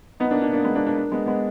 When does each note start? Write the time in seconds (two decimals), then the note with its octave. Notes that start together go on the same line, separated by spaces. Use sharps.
0.20 B3 D#4
0.31 A#3 D4
0.41 A#3 D4
0.53 A#3 D4
0.64 G#3 B3
0.75 A#3 D4
0.86 A#3 D4
0.97 A#3 D4
1.12 G#3 B3
1.26 G#3 B3